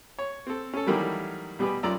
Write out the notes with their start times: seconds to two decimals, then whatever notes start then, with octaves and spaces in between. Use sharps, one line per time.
0.19 C#5
0.47 C4 A4
0.74 C#4 A4
0.87 D#3 E3 F#3 G3 A3 A#3
1.59 B2 G3 G4 G#4 B4
1.83 B1 F#2 F4 D5 A#5 E6